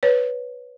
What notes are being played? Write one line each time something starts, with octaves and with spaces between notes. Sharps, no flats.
B4 C#5